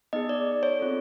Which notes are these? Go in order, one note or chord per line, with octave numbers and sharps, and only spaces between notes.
B3 D#4 G#4 D#5
D5
C#5
C4 F4 A4